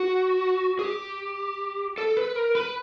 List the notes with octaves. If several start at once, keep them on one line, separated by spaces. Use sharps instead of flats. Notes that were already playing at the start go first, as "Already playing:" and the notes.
Already playing: F#4
G#4
G4
A4
B4
A#4
B4